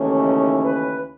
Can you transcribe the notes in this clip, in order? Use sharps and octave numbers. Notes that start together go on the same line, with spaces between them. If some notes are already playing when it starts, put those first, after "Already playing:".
Already playing: D#2 C#3 E3 A3 C#4
D#4
B4